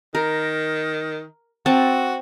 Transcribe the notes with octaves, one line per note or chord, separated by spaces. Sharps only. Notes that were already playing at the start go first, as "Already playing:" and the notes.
D#3 A#4
C4 F#4 A5